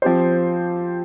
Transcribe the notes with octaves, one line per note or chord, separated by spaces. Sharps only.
F3 C4 G4 C5